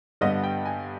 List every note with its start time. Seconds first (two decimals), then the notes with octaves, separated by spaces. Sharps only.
0.21 G2 D3 G3 B3 D#5
0.43 G5
0.65 G#5